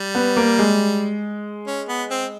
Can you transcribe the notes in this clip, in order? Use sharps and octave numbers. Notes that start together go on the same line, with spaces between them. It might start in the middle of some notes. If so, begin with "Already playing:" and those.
Already playing: G3
B3
A#3
G#3
C#4
B3
C4